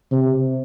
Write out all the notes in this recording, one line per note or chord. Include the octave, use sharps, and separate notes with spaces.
C3